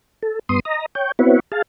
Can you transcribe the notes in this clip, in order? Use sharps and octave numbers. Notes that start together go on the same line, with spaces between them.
A4
G2 B3 C6 D#6
D#5 A#5
C#5 G5
B3 C4 E4 F#4 B4 C#5
G#4 F5 A5